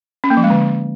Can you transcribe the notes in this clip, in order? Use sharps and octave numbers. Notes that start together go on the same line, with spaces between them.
C#4
A#3
F3
G#3
D3